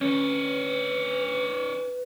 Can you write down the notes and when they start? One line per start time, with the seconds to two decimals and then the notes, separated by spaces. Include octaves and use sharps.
0.01 D2 C#4 D4 B4 C#5